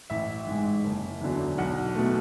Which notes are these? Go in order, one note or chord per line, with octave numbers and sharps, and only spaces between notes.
A1 E5
G#2 G#3
F#1
E2 D3 F#3
B1 F#5
B2 A3